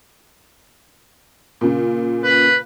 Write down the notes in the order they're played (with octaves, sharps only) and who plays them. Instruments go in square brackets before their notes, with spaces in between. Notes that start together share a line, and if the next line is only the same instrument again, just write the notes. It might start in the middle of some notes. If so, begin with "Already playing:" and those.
[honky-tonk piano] A#2 C#3
[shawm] B4